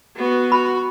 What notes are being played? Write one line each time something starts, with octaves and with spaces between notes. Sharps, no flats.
B3 F#4
F#4 B5